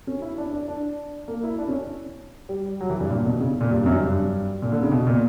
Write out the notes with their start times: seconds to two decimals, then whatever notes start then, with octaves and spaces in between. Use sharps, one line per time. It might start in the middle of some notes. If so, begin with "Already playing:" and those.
0.07 C#4
0.22 E4
0.38 D4
0.53 D4
0.68 D4
1.28 A#3
1.43 E4
1.59 D4
1.68 C#4
2.49 G3
2.81 F#3
2.90 E3
3.00 G2
3.10 A#2
3.25 B2
3.40 C#3
3.61 A#2
3.71 G2
3.86 F#2
4.01 G2
4.62 A#2
4.72 D3
4.82 C#3
4.92 B2
5.07 A#2